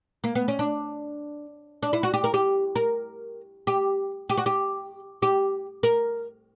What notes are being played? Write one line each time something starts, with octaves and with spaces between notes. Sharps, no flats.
A#3
B3
C#4
D4
D4
E4
F#4
G4
A#4
G4
A#4
G4
G4
F#4
G4
G4
A#4